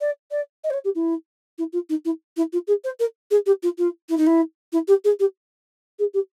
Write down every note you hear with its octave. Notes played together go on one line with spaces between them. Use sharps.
D5
D5
D#5
C5
C#5
G4
E4
E4
F4
D#4
E4
E4
F4
G#4
C5
A#4
G#4
G4
F4
F4
E4
D#4
E4
E4
G4
G#4
G4
G#4
G4